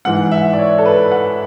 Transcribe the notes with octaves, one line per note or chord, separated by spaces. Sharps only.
G#2 E3 F#5
E5
D5
C#5
A4
B4
F#5